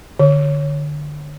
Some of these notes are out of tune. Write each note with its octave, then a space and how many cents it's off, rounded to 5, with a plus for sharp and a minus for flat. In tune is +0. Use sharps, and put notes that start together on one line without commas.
D3 +15